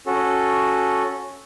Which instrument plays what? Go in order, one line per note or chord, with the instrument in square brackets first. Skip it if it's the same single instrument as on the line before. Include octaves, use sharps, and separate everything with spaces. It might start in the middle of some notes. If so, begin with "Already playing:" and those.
[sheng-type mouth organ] C#4 F#4 A4